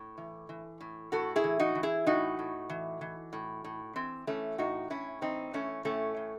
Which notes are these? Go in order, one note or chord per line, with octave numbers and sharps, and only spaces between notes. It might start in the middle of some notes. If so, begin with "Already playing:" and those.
Already playing: A2
E3
E3
A2
A2 F#4 A4
E4 G#4
E3
D#4 F#4
E3
E4 G#4
A2 D#4 F#4
A2
E3
E3
A2
A2
E3 C4
E3 A3 C#4
A2 D#4 F#4
A2 C#4 E4
E3 C4 D#4
E3 A3 C#4
A2 A3 C#4
A2